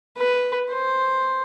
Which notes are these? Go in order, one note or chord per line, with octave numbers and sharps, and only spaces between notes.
B4
C5